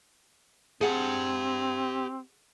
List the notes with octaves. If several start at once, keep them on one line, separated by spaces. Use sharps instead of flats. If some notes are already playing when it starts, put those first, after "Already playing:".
C4 G4 G#4 F#5 A5